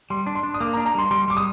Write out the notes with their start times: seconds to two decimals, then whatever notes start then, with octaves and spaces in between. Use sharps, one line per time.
0.10 G3 C6
0.27 D4
0.35 C6
0.43 D4
0.54 D#6
0.60 A#3 D6
0.73 A#5
0.77 D4
0.86 A#5
0.95 G3 C6
1.11 G3 C6
1.28 G3 D6
1.37 D#6